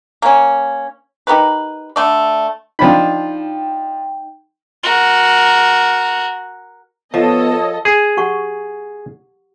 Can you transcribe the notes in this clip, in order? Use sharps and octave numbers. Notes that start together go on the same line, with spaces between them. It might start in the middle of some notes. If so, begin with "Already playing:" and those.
A#3 C#4
D#4 G4 A#4 B4
D3 A3 D5
F3 D4 D#4 G5 B5
F#4 A#4
F3 B3 A4 C#5 D#5 A5 D#6
G#4
G4 F#5 C#6